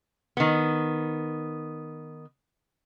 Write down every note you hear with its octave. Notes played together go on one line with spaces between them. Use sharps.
D#3 B3